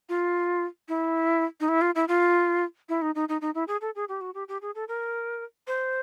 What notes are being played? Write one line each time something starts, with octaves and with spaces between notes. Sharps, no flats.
F4
E4
D#4
E4
F4
E4
F4
E4
D#4
D#4
D#4
D#4
E4
G#4
A4
G#4
G4
F#4
G4
G4
G#4
A4
A#4
C5